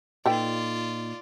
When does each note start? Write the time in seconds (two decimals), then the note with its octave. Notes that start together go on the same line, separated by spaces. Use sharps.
0.26 A#2 D#4 F4 A4 B4 D5 G5